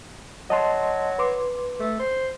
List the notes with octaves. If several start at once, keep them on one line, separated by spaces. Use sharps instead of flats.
F#3 D#5 A5 C6
B4 C6 D6
A3
C5